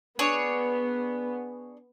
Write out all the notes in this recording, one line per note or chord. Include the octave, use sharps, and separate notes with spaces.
B3 D4 G#4 C#5